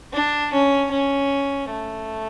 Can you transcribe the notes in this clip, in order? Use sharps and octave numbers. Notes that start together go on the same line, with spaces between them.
D4
C#4
C#4
A3